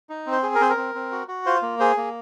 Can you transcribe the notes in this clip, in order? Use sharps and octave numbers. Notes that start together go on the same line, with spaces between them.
D#4
C4
C5
G#4
A#4
C4 C5
A#4
C4
C4
F#4
F#4
F4 C5
A#3
G#4 C5
A#3